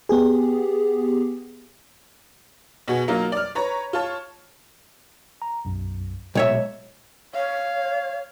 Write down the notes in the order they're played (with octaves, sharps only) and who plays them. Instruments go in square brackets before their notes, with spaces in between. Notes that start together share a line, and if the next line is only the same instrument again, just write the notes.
[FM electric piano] B3 G4 G#4
[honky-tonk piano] B2 F#4 G#4
F#3 A#3 D#4 F4
D5 F6
B4 C#5 A#5
F4 C#5 A5
[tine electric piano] A#5
B1 F#2
[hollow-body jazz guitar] B1 C#5 E5 [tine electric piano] A#2 G#3
[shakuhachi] C#5 [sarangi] F5